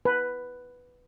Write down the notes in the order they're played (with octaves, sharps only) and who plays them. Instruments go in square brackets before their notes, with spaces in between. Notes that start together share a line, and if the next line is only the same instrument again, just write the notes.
[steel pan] B4